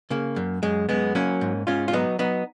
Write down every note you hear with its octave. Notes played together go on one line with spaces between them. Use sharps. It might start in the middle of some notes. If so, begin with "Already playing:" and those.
C#3 A#3
F#2
F#2 G#3
F#2 G#3 B3
F#3 A#3 C#4
G#2
G#2 C#4 F4
F4
F#3 B3 D#4
F#3 B3 D#4